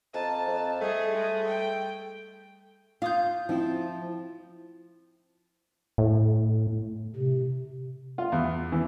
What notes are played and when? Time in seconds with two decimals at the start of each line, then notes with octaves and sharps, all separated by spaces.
0.14 F2 C5 D#5 A5 A#5
0.48 F2
0.81 G3 A3 G#4
1.14 G#3
1.47 G5
3.02 F4 F5 D#6 G6
3.49 F3 C4 E4
5.98 A2
7.16 C3
8.18 F4
8.32 E2
8.72 E3